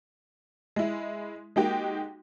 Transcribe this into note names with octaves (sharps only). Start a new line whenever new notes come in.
G#3 E4
G#3 A#3 D#4 F#4 G4 G5